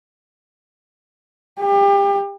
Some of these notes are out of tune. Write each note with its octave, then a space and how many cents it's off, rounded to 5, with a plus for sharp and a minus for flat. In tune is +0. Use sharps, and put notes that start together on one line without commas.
G4 +30